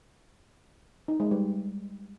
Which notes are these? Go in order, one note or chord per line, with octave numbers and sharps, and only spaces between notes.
D#4
G#3
G3